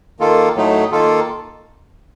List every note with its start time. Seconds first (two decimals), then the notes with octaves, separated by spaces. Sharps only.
0.20 D#3 A#3 F4 A4
0.56 A2 F#3 A3 D#4
0.92 D#3 A#3 F4 A4